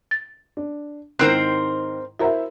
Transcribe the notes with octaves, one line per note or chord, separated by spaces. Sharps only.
A6
D4
G#2 D#3 C4 E4 A#4 C5 A#5 F#6
E4 F#4 A#4 C5 E5 A#5